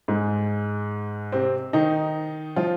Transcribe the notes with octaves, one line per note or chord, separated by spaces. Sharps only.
G#2 G#3
C3 C4
D#3 D#4
F3 F4